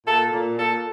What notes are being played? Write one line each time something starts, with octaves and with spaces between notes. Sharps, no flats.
A#2 A4
A#2
A#2 A4